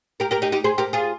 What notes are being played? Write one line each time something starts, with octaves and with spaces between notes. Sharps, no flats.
G4 A#4
G4 A#4
D#4 G4
D#4 G4
G#4 C5
G4 A#4
F4 G#4